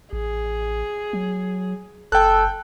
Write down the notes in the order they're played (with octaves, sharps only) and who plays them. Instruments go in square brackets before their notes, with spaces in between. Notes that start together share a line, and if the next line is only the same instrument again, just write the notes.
[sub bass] A1 [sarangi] G#4
[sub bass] F#3
[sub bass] F#1 [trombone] A4 [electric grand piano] G5 F#6